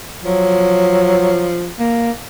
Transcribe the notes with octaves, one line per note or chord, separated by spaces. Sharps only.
F3 F#3
A#3